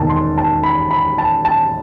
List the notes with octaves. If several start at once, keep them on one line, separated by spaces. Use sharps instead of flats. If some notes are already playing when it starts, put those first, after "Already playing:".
Already playing: E1 D#2 D#3 A5
C6
A5
B5
B5
A5
A5